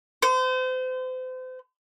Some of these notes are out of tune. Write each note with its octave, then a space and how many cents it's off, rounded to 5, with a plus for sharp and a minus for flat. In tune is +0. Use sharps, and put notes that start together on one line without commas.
C5 -35